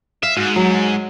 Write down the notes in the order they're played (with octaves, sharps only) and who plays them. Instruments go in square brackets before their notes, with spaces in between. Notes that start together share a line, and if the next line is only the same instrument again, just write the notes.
[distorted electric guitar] E5 [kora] F5
[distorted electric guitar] G#2 [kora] F#4
[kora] F#3